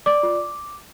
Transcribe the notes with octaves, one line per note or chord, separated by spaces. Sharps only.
D5 D6
F4